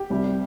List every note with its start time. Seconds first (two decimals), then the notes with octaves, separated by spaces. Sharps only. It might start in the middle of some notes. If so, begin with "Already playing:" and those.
Already playing: G4
0.10 C2 C3 G3